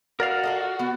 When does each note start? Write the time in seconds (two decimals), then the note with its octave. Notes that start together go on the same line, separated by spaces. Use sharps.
0.20 F#4 A#4 D5 F5
0.43 F4 A4 D#5
0.79 B3